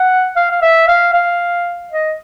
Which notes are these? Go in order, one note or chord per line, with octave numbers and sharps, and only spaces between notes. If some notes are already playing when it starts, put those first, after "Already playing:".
Already playing: F#5
F5
F5
E5
F5
F5
D#5